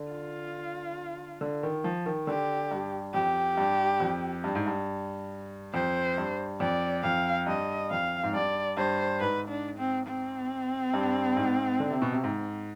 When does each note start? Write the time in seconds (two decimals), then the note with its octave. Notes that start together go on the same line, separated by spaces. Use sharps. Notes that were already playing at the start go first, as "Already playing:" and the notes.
Already playing: D3
0.11 F4
1.41 D3
1.63 D#3
1.84 F3
2.06 D#3
2.27 D3 G4
2.71 G2
3.14 F2 G4
3.57 G2
4.00 F2
4.44 G2
4.55 G#2
4.66 G2
5.74 F2 C5
6.18 G2
6.60 F2 D5
7.03 F2 F5
7.47 G2 D#5
7.91 F2 F5
8.23 G#2
8.33 G2 D5
8.77 G2 C5
9.20 G#2 B4
9.49 D4
9.78 C4
10.06 C4
10.94 G2
11.36 G#2
11.80 D3
11.91 C3
12.02 B2
12.12 C3
12.24 G#2